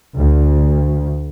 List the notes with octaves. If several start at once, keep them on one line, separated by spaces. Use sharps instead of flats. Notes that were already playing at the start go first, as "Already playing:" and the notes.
D2